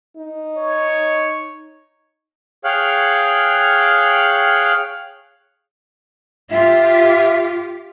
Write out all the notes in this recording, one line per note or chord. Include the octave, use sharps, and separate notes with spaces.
D#4
C#5
G#4 C#5 F5 G5 F6 F#6
F4 G4 E5